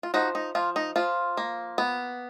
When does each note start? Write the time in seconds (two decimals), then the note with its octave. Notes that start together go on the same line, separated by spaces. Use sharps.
0.03 F4
0.14 F3 D#4 F#4
0.35 D#4
0.55 F3 F4
0.76 D#4
0.96 F3 F4
1.37 A#3
1.78 B3